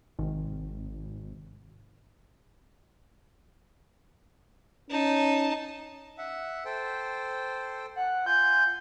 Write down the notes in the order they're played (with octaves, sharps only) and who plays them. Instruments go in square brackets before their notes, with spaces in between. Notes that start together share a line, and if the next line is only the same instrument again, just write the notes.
[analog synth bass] G#1 [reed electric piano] C3 D#3
[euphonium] C#4 [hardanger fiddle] D#4 A5
[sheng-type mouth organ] E5 F#5
A4 C5 G5
[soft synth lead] F#5
[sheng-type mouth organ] F4 G#5 [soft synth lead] G6